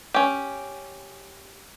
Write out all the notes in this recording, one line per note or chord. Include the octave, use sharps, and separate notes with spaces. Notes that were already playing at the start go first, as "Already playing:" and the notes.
C#4 G4